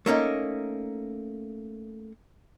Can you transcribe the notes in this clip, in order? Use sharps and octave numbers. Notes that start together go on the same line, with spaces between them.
A3 A#3 C#4 D#4